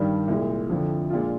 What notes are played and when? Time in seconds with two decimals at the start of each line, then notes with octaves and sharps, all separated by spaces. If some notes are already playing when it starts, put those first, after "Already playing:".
Already playing: G2 D#3 G3 D4
0.28 C2 A#2 G#3
0.69 F2 D3 F3
1.10 A#2 G#3 D4 F4